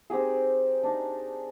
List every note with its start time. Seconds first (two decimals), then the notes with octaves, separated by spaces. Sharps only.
0.10 C4 D#4 G4 G#4
0.83 D4 D#4